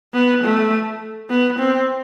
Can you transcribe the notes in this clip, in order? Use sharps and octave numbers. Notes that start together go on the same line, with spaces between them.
B3
A3
B3
C4